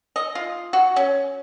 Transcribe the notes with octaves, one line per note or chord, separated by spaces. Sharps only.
D#5
F4
F#4
C#4